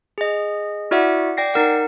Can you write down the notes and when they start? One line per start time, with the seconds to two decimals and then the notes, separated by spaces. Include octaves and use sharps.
0.18 G#4 D#5
0.91 E4 F#4 D5 E5 F#5
1.37 D5 G5 A#6 C7
1.54 D#4 A#4 F#5